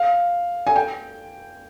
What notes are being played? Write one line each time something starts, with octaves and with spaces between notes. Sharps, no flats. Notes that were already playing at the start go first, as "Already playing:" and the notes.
Already playing: F5
G#5
G5